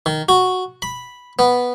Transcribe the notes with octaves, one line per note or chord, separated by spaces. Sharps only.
D#3
F#4
B5
B3